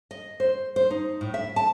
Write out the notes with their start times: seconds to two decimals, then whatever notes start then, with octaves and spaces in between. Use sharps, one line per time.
0.11 D#5
0.40 C5
0.76 C5
0.90 D#4
1.21 A2
1.34 E5
1.56 A5